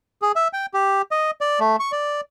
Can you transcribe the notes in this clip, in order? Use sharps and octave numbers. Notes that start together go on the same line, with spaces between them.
G#4
E5
G5
G4
D#5
D5
A3
C#6
D5